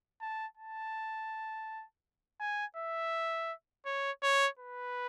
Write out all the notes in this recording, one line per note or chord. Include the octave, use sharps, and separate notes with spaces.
A5
A5
G#5
E5
C#5
C#5
B4